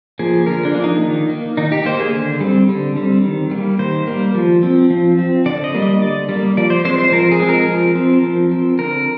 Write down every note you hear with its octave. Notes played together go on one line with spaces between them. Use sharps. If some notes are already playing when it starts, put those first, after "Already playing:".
F3 A#3 G#4
D3 A#4
D4
F3 A#3
D#4
D#3
A#3
D#3 D#4
G4
A#3 C5
G#4
D3
G3 C4
D3
G3 C4
D#3
G3 A#3
D#3 C5
G3 A#3
F3
C4
F3
C4
D3 D5
D#5
G3 A#3
D#5
D3 D5
G3 A#3
F3 D5
C5
G#3 C4 C5
C5
F3 A#4
G#4
G#3 C4
A#4
F3
C4
F3
C4
D3 A#4